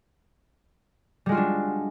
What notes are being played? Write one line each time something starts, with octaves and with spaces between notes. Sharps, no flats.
G3 G#3 D4 F4 F#4